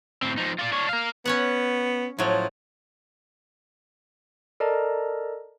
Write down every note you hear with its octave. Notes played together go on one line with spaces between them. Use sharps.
A2 C4
F3 D#4
F4 D5
D4 C#5
A#4 F5
B3 C#4 C#5 F#5
A2 F3 F#3
A4 A#4 D5 D#5 A5 A#5